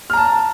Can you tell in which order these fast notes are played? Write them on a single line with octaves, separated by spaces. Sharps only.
F6 A#5 A5